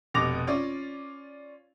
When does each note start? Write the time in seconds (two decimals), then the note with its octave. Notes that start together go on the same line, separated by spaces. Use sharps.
0.14 F1 B2 D6 A#6 F7
0.47 C#4 F4 D5 F5